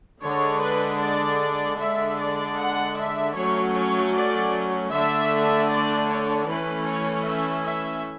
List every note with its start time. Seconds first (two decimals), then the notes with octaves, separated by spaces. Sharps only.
0.23 D3 G#3 D4 C#5
0.62 B4
1.00 D5
1.79 D3 G#3 D4 E5
2.18 D5
2.58 F#5
2.96 E5
3.36 F#3 A3 C#4 C#5
3.74 C#5
4.13 D5
4.91 D3 A3 D4 E5
5.69 D5
6.08 C#5
6.47 E3 A3 C#4 B4
6.86 C#5
7.26 E5
7.64 E5